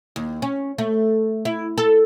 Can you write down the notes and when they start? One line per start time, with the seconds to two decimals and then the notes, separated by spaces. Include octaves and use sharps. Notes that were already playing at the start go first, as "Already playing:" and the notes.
0.16 D#2
0.42 C#4
0.78 A3
1.45 E4
1.78 A4